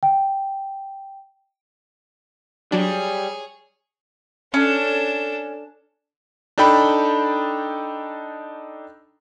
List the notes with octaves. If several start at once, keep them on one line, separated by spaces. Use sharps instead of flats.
G5
F#3 G3 D4 G#4 C#5
C#4 D4 A4
D4 D#4 A4 G5 B5